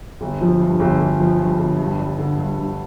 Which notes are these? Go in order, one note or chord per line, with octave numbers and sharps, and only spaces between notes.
G1
F3
G2
G1
G1
F3
G2
G1
G2
G3
D3
G2
G2